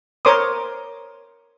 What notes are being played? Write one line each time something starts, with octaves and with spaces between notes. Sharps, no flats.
A#4 C5 C#5 C6 D6 D#6